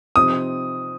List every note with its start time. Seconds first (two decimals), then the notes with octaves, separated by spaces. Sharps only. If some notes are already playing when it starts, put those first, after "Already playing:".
0.16 C3 F3 C4 D#4 G4 D#6